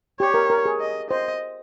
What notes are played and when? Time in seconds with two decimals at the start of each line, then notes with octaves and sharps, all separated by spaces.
0.20 G4 C#5
0.34 A#4
0.50 A#4
0.65 G#4
0.80 D#5
1.10 C5 D#5